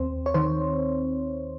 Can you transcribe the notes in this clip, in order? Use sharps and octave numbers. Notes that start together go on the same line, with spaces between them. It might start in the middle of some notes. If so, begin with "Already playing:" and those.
Already playing: D#2 C4 C5
C#5
D#3 C5